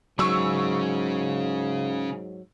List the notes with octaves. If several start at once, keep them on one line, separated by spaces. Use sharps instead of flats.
G#2 C#3 F#3 C#4 C#6 E6